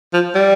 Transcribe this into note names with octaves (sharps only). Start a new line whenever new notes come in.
F3
G3